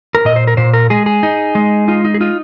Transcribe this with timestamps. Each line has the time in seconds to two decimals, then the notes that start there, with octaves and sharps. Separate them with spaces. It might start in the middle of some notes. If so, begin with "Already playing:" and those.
0.15 A#4
0.25 A#2 D#5
0.36 C5
0.47 A#4
0.57 A#2 C5
0.73 A#4
0.90 G#3 G#4
1.06 G#4
1.23 D#4
1.55 G#3
1.88 D#4 F4
2.05 D#4
2.14 G#4
2.21 D#4 F4